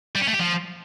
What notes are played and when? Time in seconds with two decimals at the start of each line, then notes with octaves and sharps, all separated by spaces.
0.15 G3
0.21 C#4
0.28 A3
0.34 G4
0.40 F3